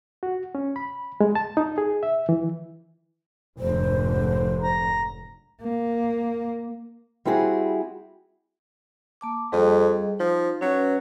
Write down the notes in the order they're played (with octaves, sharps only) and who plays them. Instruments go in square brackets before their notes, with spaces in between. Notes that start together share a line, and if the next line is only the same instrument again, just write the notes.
[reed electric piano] F#4
C#4
B5
G#3
A5
D#4
G#4
E5
E3
[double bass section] F1 G#2 D3 [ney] C5
[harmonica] A#5
[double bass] A#3
[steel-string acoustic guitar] G3 C4 E4 F#4 G#4
[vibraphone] A#3 A5 D6
[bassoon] F2 [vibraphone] G3 G#4 D#5
[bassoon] F3 [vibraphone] D#4
[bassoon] F#3 [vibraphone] C#4 B4